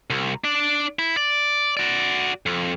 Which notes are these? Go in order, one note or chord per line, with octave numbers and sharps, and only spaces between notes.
C2
D4 D5
E4
D5
F#4 D5
F2